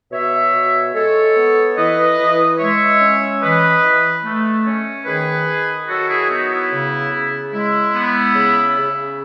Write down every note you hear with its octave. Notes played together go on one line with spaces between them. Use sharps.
B2 C#5 E5
B2
G#3 A4 C#5
B3
E3 B4 D#5
E3
G#3 C#5 E5
C#4
E3 B4 D#5
E3
A3
C#4
D#3 G#4 B4
D#3
F#3 F#4 A4
E4 G#4
B3 D#4 F#4
E4
C#3
C#3
G#3 E4
B3
C#3
C#3